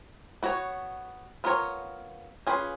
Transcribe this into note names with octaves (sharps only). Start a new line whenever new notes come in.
B3 F#4 C#5
B3 F4 A#4 C#5
C#4 F4 G#4 B4